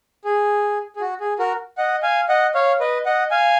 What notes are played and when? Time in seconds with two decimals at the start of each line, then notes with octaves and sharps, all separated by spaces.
0.25 G#4
0.96 G#4
1.01 F#4
1.20 G#4
1.39 F#4 A#4
1.78 D#5 F#5
2.03 F5 G#5
2.29 D#5 F#5
2.54 C#5 F5
2.80 B4 D#5
3.05 D#5 F#5
3.31 F5 G#5